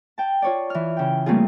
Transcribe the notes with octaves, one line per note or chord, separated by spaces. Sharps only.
G5 A5
F4 C#5 D5
E3 F6
C#3 G5
G3 A3 A#3 C4 F4 G#4